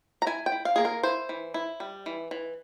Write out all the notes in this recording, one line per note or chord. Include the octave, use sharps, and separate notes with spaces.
A#5
E4 G#5
G5
E4
F5
A#3 G#4
A#4
E4 C5
E3
E4
G3
E3
E3